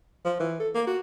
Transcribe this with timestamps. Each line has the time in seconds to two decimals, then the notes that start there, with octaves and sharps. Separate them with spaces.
0.25 F3
0.40 E3
0.60 A4
0.74 A#3
0.87 F#4